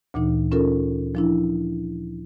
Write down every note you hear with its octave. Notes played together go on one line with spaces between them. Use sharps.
D2 A#2 E3 D#4
C#4 F4 A4 A#4
F3 D4 E4